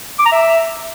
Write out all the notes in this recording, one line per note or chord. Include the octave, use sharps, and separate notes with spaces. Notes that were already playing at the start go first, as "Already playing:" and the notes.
D6
A#5
E5